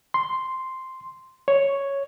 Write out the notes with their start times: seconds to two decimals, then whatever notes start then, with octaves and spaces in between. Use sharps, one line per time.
0.14 C6
1.48 C#5